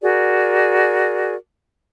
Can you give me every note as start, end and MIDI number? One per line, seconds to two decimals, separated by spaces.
0.02 1.35 66
0.02 1.35 68
0.02 1.35 70
0.02 1.35 74